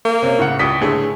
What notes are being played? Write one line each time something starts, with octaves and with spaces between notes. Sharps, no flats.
A#3
C3 C#4
A2 C#3 F#5
C#2 G3 D#6 B6
A2 D3 A3 G#4